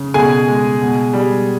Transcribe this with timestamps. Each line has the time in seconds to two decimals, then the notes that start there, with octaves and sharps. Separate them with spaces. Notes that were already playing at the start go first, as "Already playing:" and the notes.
Already playing: C#3
0.14 B2 G#4 G#5
0.48 G#3
0.81 B2
1.13 G3